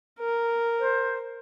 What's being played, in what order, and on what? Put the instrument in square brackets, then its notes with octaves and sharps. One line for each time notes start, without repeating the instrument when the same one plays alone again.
[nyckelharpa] A#4
[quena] C5